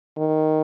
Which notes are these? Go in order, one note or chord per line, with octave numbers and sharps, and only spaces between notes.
D#3